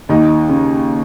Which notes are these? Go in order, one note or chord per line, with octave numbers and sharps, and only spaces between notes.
D#2 D#4
C#3